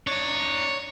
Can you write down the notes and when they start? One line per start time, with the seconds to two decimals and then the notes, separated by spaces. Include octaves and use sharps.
0.07 D4 D#4 C#5